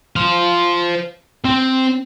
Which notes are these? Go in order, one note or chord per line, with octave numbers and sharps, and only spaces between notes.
C5 F5
C4